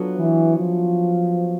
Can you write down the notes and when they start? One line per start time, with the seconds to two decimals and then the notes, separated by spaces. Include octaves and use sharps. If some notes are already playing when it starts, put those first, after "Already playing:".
Already playing: F#3 B3 D4 F4 A4
0.18 E3
0.57 F3